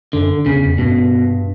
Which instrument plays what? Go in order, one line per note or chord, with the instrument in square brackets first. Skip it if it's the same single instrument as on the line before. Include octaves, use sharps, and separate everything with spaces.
[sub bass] F#2 [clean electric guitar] D3
[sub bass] E2 [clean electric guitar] C#3
[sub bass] F2
[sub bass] G2 [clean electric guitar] B2